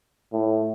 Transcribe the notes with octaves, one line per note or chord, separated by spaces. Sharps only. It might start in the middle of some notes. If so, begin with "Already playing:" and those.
A2